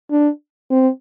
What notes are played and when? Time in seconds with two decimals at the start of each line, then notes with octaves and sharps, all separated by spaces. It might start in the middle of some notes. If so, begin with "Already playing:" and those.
0.11 D4
0.70 C4